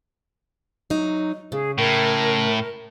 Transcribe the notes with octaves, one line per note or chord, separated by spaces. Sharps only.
F#3 D#4
C#3 G#4
A2 A#4